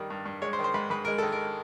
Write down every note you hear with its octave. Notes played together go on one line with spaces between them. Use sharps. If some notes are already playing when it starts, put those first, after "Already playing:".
Already playing: G2 D#3 G3
G2
G2
G#3 C#5
C5
D#3
C5
G#2 B4
G#2 B4
G#3 A#4
D#3 A4
A#4